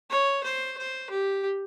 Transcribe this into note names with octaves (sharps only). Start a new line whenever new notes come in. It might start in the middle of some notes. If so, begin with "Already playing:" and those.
C#5
C5
C5
G4